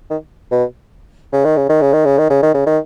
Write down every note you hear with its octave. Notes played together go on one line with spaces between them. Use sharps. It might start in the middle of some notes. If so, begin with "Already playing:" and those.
D#3
B2
C#3
D#3
C#3
D#3
C#3
D#3
C#3
D#3
C#3
D#3
C#3
D#3